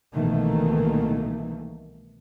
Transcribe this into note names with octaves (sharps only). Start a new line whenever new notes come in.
C2 B2 D#3 E3 A3 A#3